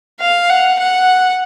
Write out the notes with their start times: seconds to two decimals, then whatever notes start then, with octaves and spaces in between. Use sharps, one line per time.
0.20 F5
0.49 F#5
0.79 F#5